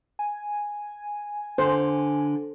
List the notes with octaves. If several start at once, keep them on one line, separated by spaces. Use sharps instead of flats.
G#5
D3 C5